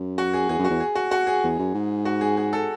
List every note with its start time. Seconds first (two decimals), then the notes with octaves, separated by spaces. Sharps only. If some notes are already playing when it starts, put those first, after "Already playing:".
Already playing: F#2
0.18 F#4
0.34 G#4
0.49 E2 G#4
0.59 F#2
0.65 F#4
0.70 E2
0.80 G#4
0.95 F#4
1.11 F#4
1.27 G#4
1.43 E2
1.59 F#2
1.74 G#2
2.05 F#4
2.21 G#4
2.37 G#4
2.53 A4